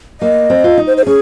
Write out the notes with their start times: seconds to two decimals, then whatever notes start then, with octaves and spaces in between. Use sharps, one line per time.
0.21 A#3 D#5
0.50 C4
0.64 F4
0.78 D#4
0.87 C5
0.97 C5
1.06 C#4 G#4